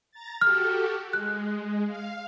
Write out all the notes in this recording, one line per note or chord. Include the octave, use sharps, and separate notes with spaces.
A#5 A6
F#4 G4 A4 F6
G#3 F#6
F5